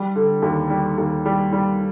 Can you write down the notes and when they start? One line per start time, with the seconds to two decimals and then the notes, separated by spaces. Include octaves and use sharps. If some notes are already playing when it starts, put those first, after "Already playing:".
Already playing: G3
0.16 D3
0.42 D#2
0.70 G3
0.98 D#2
1.25 G3
1.53 G3